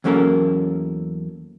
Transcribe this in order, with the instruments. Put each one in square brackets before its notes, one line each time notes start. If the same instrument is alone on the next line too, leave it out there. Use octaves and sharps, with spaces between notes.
[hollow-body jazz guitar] E2 F#3 A#3 C#4 A4 A#4